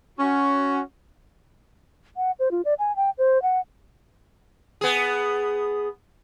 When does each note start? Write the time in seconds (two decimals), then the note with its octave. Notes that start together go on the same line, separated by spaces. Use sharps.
0.19 C#4 F#4
2.17 F#5
2.39 C5
2.51 F4
2.65 D5
2.79 G#5
2.96 G5
3.18 C5
3.42 F#5
4.81 B3 G#4